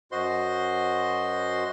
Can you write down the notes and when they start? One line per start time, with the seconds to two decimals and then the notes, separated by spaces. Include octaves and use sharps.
0.12 F#2 F#4 C5 D#5 C6